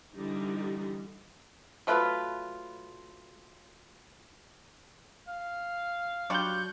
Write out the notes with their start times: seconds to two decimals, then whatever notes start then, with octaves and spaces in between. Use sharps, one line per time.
0.16 D3 E3 G3 D#4
1.87 F#3 A3 F4 B4
5.28 F5
6.30 F#3 G3 D4 F4 C#6 F#6 G6